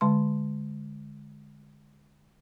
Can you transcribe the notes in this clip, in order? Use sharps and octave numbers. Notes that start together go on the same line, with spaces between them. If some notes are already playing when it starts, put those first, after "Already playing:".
D3 G#3 A5 C6